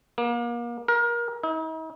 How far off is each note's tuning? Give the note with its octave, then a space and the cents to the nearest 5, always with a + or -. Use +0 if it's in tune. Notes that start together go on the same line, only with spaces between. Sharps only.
A#3 +35
A#4 +25
D#4 +45